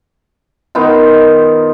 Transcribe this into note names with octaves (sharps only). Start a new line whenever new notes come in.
D#3 B3 D#4 F4